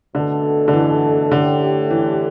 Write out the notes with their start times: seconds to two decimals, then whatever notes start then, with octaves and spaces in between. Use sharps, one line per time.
0.15 B2 D3 A3 D4 A4
0.68 D3
0.73 E3
1.32 A2 D3 A3 G4
1.90 E3